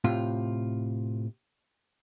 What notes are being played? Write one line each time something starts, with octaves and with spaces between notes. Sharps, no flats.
A2 C3 F4